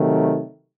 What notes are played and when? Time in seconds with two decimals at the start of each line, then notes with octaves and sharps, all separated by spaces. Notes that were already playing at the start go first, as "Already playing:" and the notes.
Already playing: C3 D#3 F#3 A3